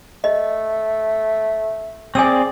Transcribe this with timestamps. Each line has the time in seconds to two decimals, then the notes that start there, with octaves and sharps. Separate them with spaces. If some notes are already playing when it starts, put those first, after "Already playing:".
0.24 A3 D#5
2.15 C4 G#4 D5 G#5 E6